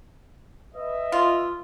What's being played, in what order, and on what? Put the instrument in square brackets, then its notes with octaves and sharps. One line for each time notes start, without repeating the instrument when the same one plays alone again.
[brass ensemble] B4 D#5 E5
[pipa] F4